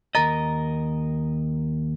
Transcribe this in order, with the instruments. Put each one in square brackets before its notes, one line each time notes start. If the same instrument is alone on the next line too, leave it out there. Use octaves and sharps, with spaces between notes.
[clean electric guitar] D#2 A#4 D#5 [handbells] A#5 A6